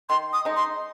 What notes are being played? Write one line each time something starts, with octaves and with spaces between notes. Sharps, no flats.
D#3 C6
D#6
G#3 D#4
C6